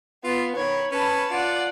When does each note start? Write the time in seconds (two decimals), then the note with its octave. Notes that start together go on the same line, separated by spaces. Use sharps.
0.24 B3 F4
0.56 D#3 C#5 B5
0.92 C#4 B4 A5
1.31 F4 D5 F#5